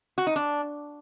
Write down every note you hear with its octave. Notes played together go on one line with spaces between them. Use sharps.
F#4
D#4
D4